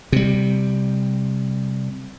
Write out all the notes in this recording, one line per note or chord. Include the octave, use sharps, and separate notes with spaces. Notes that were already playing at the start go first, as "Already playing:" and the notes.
C3 G3